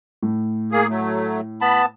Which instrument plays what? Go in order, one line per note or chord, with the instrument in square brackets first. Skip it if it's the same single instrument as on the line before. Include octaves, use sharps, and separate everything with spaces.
[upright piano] A2
[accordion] A#3 G#4
F#3 A3
[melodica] B3 A5 [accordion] B5